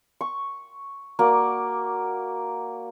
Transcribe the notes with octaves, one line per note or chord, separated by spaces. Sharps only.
C#6
A#3 F#4 D5